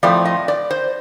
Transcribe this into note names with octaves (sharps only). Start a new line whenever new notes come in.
A2 F3 A3 C4 D5
D#5
D5
C5